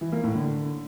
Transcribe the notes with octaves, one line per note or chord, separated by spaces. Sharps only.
E3
A#3
A2
D3